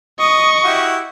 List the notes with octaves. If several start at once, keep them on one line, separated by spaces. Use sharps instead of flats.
D#5 C#6 D#6
E4 F#4 G4